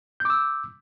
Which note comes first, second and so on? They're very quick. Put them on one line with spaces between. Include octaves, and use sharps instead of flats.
G6 D6 E6